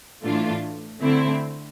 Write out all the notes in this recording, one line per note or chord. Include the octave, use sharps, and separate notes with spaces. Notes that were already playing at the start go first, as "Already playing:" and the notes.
A2 E3 A3 D4 F4
D3 A3 C4 E4